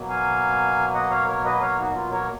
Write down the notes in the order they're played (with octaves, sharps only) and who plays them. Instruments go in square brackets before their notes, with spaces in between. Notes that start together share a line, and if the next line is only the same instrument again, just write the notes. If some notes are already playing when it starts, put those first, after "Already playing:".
Already playing: [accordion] B2 F#3 A#3
F5 G#5
D#5 F#5
C#5 F5
A#4 C#5
B4 D#5
C#5 F5
D#4 F#4
F4
A#4 C#5